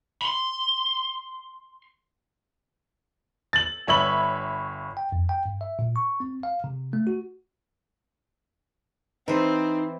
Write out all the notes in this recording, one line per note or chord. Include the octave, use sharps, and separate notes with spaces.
B5 C6
A6 F#7
G1 C#5 E5 B5 F#7
G5
F2
G5
G2
E5
A#2
C#6
C4
F5
C3
A3
F#4
E3 C4 D#4 C5